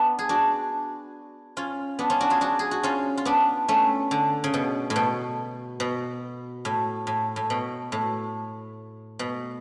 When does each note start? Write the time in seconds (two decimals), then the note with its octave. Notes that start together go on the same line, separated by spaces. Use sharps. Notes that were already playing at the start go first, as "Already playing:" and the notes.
Already playing: B3 D4
0.19 G#4
0.29 D4 F#4
1.57 C#4 F4
1.99 B3 D4
2.10 C#4 F4
2.20 D4 F#4
2.30 F4 G#4
2.41 D4 F#4
2.59 G#4
2.71 F#4
2.83 C#4 F4
3.17 F4
3.25 B3 D4
3.68 A3 C#4
4.11 D3
4.44 C#3
4.54 B2
4.90 A2
4.96 B2
5.80 B2
6.65 A2
7.07 A2
7.36 A2
7.50 B2
7.92 A2
9.19 B2